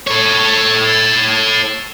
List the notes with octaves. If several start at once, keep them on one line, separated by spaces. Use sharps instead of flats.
A4 C#5